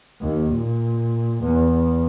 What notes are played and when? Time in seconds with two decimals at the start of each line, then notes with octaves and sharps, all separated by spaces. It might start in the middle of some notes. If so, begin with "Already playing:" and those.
0.22 D#2
0.55 A#2
1.43 E2